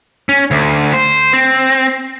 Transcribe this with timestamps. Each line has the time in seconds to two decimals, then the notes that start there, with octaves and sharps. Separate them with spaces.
0.29 C#4
0.51 D2
0.93 C5
1.33 C4